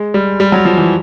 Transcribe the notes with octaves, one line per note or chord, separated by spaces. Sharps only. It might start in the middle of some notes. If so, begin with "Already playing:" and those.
Already playing: G#3
G3
G3
F#3
F3
E3